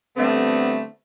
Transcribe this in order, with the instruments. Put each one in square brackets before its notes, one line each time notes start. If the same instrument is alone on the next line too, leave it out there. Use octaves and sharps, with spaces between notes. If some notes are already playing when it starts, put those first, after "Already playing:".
[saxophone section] D3 G3 A3 B3 C4